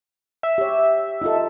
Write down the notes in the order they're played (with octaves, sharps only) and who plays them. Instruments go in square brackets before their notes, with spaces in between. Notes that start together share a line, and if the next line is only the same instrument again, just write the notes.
[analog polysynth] E5
[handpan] G4 C#5
D#4 F4 A4